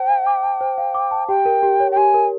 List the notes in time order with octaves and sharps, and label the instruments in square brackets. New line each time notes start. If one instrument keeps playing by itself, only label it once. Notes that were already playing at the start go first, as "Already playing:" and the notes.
Already playing: [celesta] C5 A5 [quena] G5
[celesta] F5
D6
A5
C5
F5
D6
A5
[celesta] G4 [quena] G5
[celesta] A#4
G4
C#5
[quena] G5
[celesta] G4 [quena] G#5
[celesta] A#4